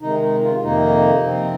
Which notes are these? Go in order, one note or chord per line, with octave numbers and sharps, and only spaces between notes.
C3 D#3 G#3 D#4
D#4
F4
F2 C3 D#3 A#3 D#4
C3 F3 C4